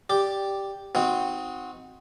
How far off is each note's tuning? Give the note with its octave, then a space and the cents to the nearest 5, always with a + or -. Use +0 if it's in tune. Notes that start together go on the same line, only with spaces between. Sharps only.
G4 +0 D5 +0
C4 -10 D#4 +15 F#4 -20